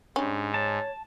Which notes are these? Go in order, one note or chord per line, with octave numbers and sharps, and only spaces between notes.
G#2 G3 C#4 D4
C#5 A5